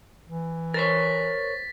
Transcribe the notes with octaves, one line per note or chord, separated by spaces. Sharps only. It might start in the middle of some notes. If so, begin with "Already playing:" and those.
E3
A#4 C5 C#5 A6 B6